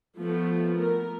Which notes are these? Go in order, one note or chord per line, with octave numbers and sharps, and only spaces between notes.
F3 A3 B3
A#4